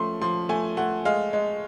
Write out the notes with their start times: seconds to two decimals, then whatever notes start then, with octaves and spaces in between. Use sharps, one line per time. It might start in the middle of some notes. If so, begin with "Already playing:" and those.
Already playing: F3 A3 C#4 C6
0.22 F3 C6
0.49 A3 G#5
0.77 A3 F#5
1.05 G#3 F5
1.33 G#3